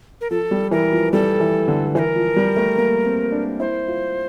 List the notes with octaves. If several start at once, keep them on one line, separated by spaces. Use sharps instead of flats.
A#4
F3 A4
G3
E3 A#4
F3
G3 A4
E3
D3
E3 C5
A#4
F3
G3
A3
A#3
C4
D4
E4 C5
F4